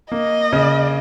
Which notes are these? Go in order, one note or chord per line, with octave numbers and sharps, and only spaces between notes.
A#3 D#5
C#3